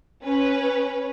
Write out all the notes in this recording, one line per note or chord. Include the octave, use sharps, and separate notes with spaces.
C#4 B4